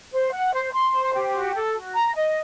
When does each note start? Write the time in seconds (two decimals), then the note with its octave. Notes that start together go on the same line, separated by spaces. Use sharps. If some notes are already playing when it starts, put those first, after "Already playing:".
0.12 C5
0.32 F#5
0.53 C5
0.72 C6
0.94 C5
1.14 G4
1.33 F#4
1.54 A4
1.74 F#4
1.94 A#5
2.15 D#5